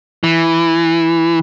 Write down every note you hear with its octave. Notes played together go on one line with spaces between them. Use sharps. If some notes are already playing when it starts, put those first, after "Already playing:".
E3